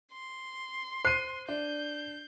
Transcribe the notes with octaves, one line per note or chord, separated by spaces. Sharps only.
C6
C5 C7 D#7
D4 G6